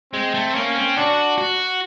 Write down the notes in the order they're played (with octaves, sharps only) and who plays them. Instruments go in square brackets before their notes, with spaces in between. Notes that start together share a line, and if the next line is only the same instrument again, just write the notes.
[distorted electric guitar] G#3 [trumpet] C4
[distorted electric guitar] A3
[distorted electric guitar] A#3 [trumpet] C#4
[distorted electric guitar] C4
[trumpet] D4 [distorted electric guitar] F#4
[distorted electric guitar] F#4